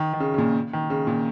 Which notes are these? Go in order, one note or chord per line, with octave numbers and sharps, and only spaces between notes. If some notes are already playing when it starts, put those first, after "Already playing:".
Already playing: D#3
D#3
C#3
C#3
A#2
D#3
C#3
A#2